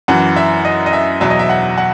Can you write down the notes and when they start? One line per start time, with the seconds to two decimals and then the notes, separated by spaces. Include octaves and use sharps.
0.08 F#2 E3 F#5
0.36 E5
0.65 D#5
0.86 D#5
0.93 E5
1.21 E2 B2 F#3 E5
1.30 D#5
1.39 E5
1.49 F#5
1.78 F#5